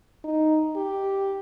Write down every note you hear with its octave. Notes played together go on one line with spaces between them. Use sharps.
D#4
G4